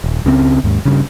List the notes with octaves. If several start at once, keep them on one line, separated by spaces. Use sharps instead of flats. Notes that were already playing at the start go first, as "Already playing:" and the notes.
D#1
C#2 C#3 E3 C4
D#2 G#2
G2 C#3